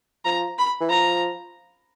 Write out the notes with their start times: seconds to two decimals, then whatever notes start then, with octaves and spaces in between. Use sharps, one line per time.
0.25 F3 A#5
0.58 B5
0.81 E3
0.90 F3 A#5